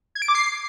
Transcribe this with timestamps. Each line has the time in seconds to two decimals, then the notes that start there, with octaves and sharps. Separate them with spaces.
0.15 G#6
0.22 D7
0.28 D6
0.35 C7